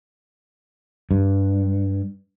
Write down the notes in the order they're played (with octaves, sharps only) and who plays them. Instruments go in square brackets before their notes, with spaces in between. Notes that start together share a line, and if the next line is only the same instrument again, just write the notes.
[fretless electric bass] G2